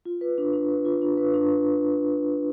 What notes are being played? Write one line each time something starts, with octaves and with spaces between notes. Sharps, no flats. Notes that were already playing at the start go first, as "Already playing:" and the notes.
F4
B4
D4
D4
B4
F4
D4
B4
D4
D4